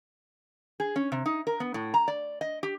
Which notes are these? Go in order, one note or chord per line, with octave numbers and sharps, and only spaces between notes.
G#4
C#4
C3
D#4
A#4
B3
A2
A#5
D5
D#5
G4